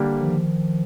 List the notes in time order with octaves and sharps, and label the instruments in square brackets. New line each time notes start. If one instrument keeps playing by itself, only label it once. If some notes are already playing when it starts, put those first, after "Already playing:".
Already playing: [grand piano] D3 G3 A#3
[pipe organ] D#3 F3